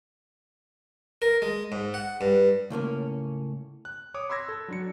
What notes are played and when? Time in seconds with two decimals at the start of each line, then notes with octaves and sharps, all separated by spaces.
1.22 A#4
1.42 G#3
1.72 G#2
1.94 F#5
2.21 G2
2.70 C#2 A2 A#3 C#4
3.85 F#6
4.14 C#5 D6 D#6
4.29 B5 C6 E6 G#6 A#6
4.49 A4
4.68 F#3 D4 C#7